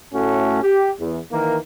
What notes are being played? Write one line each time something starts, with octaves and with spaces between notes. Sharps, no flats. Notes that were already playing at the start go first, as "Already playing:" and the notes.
A2 A3 C#4 F#4
G4
E2
D#3 E3 A#3